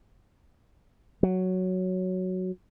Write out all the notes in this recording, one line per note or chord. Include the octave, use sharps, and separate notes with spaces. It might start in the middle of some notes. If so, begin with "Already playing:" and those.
F#3